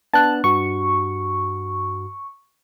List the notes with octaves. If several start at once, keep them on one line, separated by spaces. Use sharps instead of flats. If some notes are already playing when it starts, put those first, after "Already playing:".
B3 D4 A5 F#6
G2 F#4 C#6